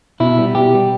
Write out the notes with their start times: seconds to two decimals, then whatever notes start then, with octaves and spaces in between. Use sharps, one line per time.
0.20 B2 E4
0.38 G3 B3
0.55 B2 G4
0.72 G3 B3